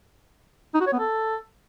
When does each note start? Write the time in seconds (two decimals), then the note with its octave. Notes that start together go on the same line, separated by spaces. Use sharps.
0.75 D#4
0.81 F#4
0.87 C#5
0.93 B3
0.99 A4